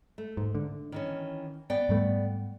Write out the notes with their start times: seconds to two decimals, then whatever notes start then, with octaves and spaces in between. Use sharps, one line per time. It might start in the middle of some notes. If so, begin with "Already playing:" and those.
0.18 A3
0.37 G#2
0.55 D3
0.92 D#3 E3 C#4
1.70 B3 D5 G5
1.89 G#2 G3 A3